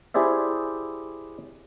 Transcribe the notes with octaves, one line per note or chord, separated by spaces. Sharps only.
E4 G4 G#4 C5 D5 E5